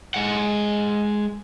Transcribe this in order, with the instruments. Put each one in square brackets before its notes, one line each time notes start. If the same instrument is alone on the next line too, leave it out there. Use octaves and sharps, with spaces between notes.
[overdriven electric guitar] G#3 F#5